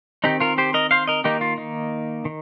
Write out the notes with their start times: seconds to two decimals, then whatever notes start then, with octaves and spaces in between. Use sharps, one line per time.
0.24 D#3 C4 D#4 G4
0.40 F4 A#4
0.58 G4 C5
0.74 A#4 D#5
0.91 C5 F5
1.08 A#4 D#5
1.24 D#3 A#3 D#4 G4
1.41 F4
1.58 D#4
2.25 D#3